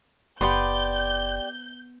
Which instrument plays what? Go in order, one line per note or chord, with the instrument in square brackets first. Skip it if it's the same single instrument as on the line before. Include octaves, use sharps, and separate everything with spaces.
[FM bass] F#1 [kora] B3 B4 [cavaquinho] G4 D5 C6 [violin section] G6